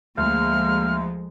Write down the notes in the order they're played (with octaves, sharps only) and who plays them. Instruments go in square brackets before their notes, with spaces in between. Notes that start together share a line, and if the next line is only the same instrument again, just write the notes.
[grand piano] D2 [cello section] F3 G#3 [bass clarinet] A#3 [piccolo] F6